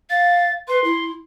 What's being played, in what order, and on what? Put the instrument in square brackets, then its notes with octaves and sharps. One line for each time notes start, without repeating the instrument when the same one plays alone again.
[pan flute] F5 [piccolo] A6
[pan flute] B4 [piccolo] C6
[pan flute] E4